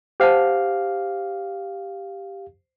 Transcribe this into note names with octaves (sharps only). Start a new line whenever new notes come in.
G4 C5 F5 F#5 A5